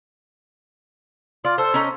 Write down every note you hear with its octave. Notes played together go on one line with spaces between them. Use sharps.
F4 D5
A4 C5
C#4 D#4